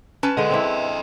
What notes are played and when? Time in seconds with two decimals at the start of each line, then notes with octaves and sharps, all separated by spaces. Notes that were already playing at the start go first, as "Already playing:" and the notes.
0.23 C#4 B4 A5
0.37 D3 G#3 A4 D#5
0.50 C4 D4 E4